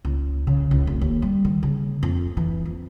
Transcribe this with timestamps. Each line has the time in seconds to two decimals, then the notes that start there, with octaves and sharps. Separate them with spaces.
0.05 C#2
0.47 C#3
0.71 C#2
0.87 F1
1.01 D#2
1.22 G3
1.45 D#3
1.63 C#3
2.03 F2
2.37 E3
2.65 F2